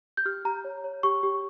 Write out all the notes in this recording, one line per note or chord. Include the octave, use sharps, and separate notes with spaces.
G6
G4 F6
G4 A#5
C#5
C#5
G4 C#6
G4